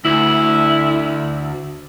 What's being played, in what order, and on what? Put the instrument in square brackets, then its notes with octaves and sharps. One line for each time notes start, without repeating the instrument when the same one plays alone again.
[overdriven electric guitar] D2 [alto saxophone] E4